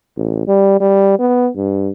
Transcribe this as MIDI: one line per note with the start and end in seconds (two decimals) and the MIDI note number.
0.17 0.45 33
0.47 0.78 55
0.80 1.18 55
1.19 1.49 59
1.56 1.91 43